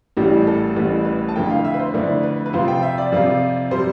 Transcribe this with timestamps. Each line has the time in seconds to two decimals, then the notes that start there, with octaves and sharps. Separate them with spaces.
0.17 A1 A2 E3 G3 G4
0.47 A4
0.76 A1 A2 E3 G3 B4
1.05 B4
1.29 A5
1.36 F2 D3 A3 E4 G5
1.50 F5
1.64 E5
1.74 B4
1.80 C5
1.94 F2 D3 A3 E4 D5
2.23 B4
2.46 B4
2.53 F2 C3 F3 C4 F4 C5
2.68 G5
2.82 E5
2.98 D5
3.12 F2 C3 F3 C4 F4
3.71 C3 G3 C5